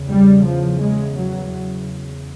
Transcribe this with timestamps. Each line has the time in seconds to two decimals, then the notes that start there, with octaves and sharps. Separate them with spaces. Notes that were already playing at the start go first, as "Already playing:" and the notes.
Already playing: E2 C#3
0.09 G3
0.46 F3
0.82 G#3
1.18 F#3